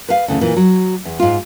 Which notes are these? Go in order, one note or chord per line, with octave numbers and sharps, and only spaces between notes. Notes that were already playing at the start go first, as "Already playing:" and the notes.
B4 F5
D2 C#3 E3
A#2 E3
F#3
E2
G#2 F4